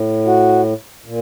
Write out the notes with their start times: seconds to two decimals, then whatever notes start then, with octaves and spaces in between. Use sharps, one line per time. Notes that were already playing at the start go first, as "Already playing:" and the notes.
Already playing: A2
0.26 F#4
1.06 A#2